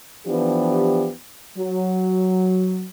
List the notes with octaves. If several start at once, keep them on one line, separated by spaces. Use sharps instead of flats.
E3 F3 B3 D4 G4
F#3